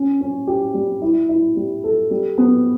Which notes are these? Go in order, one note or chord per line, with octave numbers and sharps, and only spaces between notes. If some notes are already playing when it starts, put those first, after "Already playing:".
Already playing: C#4
C#4
G4
G3
E4
E4
G3
A4
G3
B3